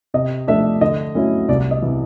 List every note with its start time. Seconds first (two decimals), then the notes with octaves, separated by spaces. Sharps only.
0.14 C3 D#5
0.47 F3 A3 D4 E5
0.81 D3 D#5
1.15 F#3 A3 C#4 E4
1.48 C2 D5
1.71 D#5
1.82 C3 E3